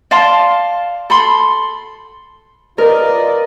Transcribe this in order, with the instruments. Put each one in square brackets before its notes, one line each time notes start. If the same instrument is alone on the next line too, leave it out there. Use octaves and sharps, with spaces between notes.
[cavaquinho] D5 F5 A5 C6
A4 B5 C6
[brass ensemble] F4 B4 [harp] A#4 [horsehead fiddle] D5 D#5